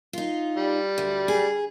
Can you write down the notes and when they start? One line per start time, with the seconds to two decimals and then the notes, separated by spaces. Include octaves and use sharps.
0.13 D#4 F4
0.57 G3
0.98 D2
1.28 G#4